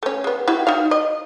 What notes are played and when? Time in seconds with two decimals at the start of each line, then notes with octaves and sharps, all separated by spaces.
0.03 A3 C#4
0.24 G#3 B3
0.48 E4 F#4 G4
0.67 D#4 F#4 F5
0.91 D#5